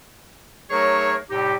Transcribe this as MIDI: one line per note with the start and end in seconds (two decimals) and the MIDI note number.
0.70 1.16 54
0.70 1.16 57
0.70 1.16 63
0.70 1.16 68
0.70 1.16 70
0.70 1.16 73
1.30 1.55 45
1.30 1.55 48
1.30 1.55 55
1.30 1.55 63
1.30 1.55 67